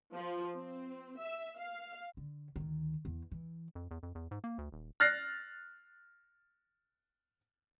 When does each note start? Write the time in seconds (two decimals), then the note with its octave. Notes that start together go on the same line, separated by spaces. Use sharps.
0.15 F3
0.55 C4
1.19 E5
1.59 F5
2.17 D3
2.56 D2 D#3
3.05 E2
3.32 E3
3.75 F2
3.91 E2
4.03 F2
4.15 E2
4.31 G#2
4.44 A#3
4.58 D2
4.72 D#1
5.00 F6 F#6 A6 A#6 C7